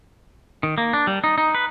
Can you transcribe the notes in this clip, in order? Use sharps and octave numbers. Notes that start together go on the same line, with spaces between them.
D#3
A#3
D4
G3
D#4
D#4
B4